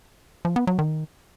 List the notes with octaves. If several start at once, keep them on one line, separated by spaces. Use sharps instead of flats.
F3
B3
F#3
D#3